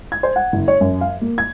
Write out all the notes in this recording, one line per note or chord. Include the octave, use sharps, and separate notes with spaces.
G#6
C5
F#5
F#1
C#5
F#2
F5
A#3
G#6